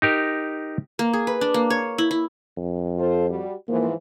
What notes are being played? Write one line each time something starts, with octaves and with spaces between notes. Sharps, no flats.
D#4 G4 A#4
A#3
G#4
B4
D4
A#3
C#5
E4
E4
F2
F4 A4 C5
G3 F#4
G#2 E3 F3 A#3